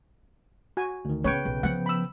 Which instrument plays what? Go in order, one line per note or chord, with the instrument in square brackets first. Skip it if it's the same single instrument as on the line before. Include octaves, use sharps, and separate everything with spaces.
[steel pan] F#4 G#5
[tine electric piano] D2 D#3
[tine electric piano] C#3 B4 G5 [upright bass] A#3 B3 [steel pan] C#5
[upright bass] B1
[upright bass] F3 B3 [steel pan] F#5
[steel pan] B5 E6